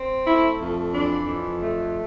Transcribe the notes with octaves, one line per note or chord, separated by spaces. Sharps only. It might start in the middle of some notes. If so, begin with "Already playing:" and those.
Already playing: C4
A3 E4
F2
E3 D4
F2
A3